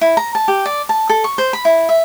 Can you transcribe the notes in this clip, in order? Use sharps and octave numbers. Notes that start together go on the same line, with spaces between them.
E4
A#5
A5
G4
D5
A5
A4
C#6
C5
B5
E4
E5